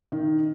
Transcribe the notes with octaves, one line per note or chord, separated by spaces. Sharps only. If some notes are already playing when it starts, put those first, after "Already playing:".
D#3